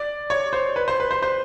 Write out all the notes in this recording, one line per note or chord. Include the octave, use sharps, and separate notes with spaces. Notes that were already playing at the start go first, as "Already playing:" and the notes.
Already playing: D5
C#5
C5
B4
C5
B4
C5
C5